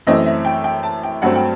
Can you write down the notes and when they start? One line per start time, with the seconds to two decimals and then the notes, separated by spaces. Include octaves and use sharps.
0.07 F#2 E3 A3 C4 D#5
0.26 E5
0.45 G5
0.64 G5
0.83 A5
1.03 G5
1.22 G2 F#3 A3 C4 F#5
1.35 G5